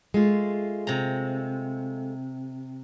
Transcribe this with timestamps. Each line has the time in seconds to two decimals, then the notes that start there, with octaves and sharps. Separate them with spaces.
0.14 G#3 A3 F4
0.87 C3 A#5